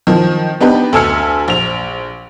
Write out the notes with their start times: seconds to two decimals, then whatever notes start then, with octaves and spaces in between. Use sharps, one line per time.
0.07 D#3 F3
0.61 B3 D4 D#4 G4 B4
0.93 D2 A4 G#5 E6 F6 C#7
1.48 A#1 F7